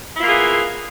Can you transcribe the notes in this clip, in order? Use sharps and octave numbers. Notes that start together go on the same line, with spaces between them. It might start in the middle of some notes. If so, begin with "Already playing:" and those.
A#3 B3 E4 F4 G#4